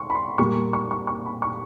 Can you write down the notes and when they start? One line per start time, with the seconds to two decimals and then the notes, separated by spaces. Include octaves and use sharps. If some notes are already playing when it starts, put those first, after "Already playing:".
Already playing: C6 C#6
0.10 B5
0.15 C6
0.38 A#2 G3 A#3 C#6
0.73 C#6
0.91 C#6
1.07 C#6
1.25 B5
1.42 C#6